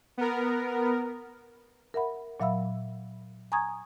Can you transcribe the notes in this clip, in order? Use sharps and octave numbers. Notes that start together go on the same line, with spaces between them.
B3 A#4
A#4 E5 F#5 B5
A#2 F#3 E5 F5 B5 E6
G#5 A#5 C#6 D#6 G#6